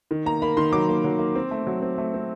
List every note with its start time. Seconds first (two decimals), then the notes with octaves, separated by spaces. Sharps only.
0.11 D#3
0.26 A#3 A#5
0.42 A#3 B5
0.57 D#3 C6
0.72 F#3 D6
0.89 A#3
1.04 F#3
1.19 A#3
1.35 C4
1.51 A3
1.67 F#3
1.82 C4
1.98 A3
2.14 C4